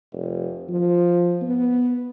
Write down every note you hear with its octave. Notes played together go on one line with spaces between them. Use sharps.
F1
F3
B3